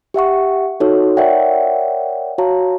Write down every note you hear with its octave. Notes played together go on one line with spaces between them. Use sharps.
G4 E5 F#5 C#6
D#4 F#4 A4 C#5
A#4 C#5 D5 E5 F#5 G5
F#4 C#5 F5 A5 A#5